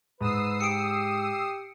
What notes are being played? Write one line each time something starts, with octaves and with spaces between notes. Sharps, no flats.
G#2 B4 D#6 E6 C7
G4 C#7 D7